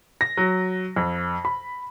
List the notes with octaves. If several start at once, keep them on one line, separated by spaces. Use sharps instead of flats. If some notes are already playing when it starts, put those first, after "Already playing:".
A#6
F#3
F2
B5